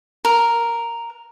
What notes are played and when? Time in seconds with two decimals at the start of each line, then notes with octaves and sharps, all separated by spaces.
0.25 A#4